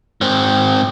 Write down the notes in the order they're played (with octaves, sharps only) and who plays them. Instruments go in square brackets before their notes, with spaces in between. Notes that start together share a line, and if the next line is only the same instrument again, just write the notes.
[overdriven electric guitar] G#2 C4